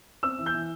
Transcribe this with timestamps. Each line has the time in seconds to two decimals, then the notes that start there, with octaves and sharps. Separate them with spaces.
0.23 C4 E6
0.38 E3
0.46 G6
0.54 E3